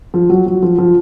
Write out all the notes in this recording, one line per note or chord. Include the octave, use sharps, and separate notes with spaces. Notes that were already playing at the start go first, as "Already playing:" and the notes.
F3
F#3
F#3
F3
F3